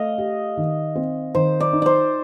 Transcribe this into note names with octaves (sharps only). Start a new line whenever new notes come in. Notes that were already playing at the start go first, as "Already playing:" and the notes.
Already playing: A3 D#5 F5
G4
D#3
C4
D#3 C5
D5
D#4
C5 D5